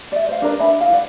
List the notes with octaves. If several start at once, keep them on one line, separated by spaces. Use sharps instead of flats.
D5 E5
C5 F5
D4 A#4 B4 D5
D4 E5 G#5 B5
E4 F5
D5 F#5